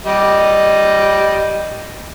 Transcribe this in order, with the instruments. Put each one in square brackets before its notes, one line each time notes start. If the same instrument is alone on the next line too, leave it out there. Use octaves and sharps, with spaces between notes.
[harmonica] G3 D#5